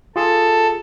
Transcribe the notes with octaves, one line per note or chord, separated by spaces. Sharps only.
F4 G#4 A4